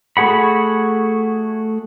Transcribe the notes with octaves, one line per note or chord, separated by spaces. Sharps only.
A3 F#4 G#4 F#5 B5